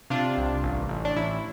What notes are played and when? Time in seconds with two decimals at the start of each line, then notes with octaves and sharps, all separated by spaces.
0.10 C3 D4 F4
0.37 C2
0.63 A1
0.89 A1
1.05 D4
1.16 A1 E4